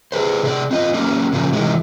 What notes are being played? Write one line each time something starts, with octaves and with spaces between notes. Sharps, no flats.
G#4 B4 C5
C3 G#4 D5
C4 F4 D#5
F#3 A#3 C#4 A4
A#2 C#3 F3
C3 D#3 E3 F#3 G#3 A3